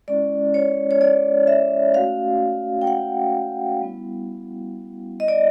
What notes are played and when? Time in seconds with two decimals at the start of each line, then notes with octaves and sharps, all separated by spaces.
0.08 G#3 C#4 E4 D5
0.54 C#5
0.91 C#5
1.01 D5
1.47 E5
1.94 A3 C#4 F#4 F5
2.81 G5
2.87 F#5
3.81 G3 B3 E4
5.20 D#5
5.28 D5